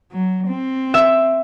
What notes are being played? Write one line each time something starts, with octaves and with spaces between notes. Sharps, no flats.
F#3
C4
E5